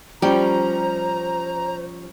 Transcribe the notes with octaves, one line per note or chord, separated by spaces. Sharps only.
F3 G3 C#4 C5 G5 A#5